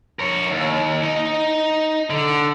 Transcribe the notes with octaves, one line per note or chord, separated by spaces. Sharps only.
A#4 C#5
D#2
D#4
D3